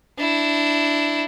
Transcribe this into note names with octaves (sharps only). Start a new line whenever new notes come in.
D4 E4